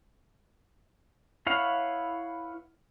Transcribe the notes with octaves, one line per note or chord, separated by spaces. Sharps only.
E4 B4 C#5 F5 F#5